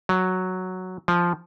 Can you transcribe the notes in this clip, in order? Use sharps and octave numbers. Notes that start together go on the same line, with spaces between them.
F#3
F3